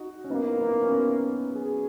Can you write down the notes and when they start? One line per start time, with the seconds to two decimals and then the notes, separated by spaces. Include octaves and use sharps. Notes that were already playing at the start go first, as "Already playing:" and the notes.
Already playing: D#4 F#4
0.24 C#4
0.30 F#2 D#3 A#3 B3 D#4 E4
0.60 B3 D#4
0.83 C#4
0.91 B3
1.50 F#3 C#4 G#4